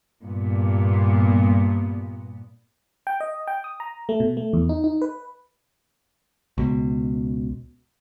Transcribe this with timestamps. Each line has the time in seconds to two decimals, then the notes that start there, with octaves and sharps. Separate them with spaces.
0.23 G2 A#2 B3
3.07 G5
3.20 D#5
3.47 G5
3.64 D#6
3.80 A#5
4.09 A3
4.20 B2
4.37 A3
4.53 E2
4.69 D#4
4.84 D#4
5.02 B4
6.58 C#2 B2